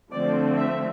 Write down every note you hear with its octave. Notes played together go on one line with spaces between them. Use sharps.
D3 F3 A3 C4 D5
E5